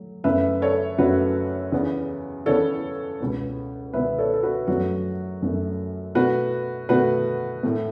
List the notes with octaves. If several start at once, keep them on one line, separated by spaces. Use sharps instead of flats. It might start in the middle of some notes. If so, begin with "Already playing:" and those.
Already playing: F#3 A3
F#2 C#3 A3 B4 E5
A4 C#5
F#2 C#3 A3 F#4 B4
E2 C#3 E3 B3
E2 C#3 E3 B3 A4 C#5
C#2 B2 B3
C#2 B2 B3 B4 E5
A4 C#5
A4
F#4 B4
F#2 F#3 A3 F#4
F#2 F#3 A3
B2 A3 F#4 B4
B2 A3 F#4 B4
A2 E3 A3